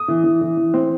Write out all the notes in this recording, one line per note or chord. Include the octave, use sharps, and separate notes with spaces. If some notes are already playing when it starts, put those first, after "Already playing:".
Already playing: D#6
E3
E3
E3
E3
C4